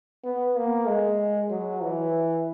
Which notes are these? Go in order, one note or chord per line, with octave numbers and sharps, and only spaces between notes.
B3
A#3
G#3
F#3
E3